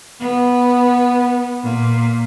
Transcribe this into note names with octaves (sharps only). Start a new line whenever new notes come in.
B3
A#2